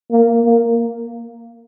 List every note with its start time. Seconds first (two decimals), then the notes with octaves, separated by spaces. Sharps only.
0.11 A#3
0.46 A#3